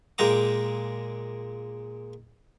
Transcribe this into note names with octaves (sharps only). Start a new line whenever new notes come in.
A#2 G#3 G5 A#5 D6